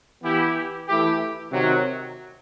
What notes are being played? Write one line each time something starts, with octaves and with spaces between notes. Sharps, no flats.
E3 B3 E4 G4
E3 A3 E4 G4
C3 D#3 F#3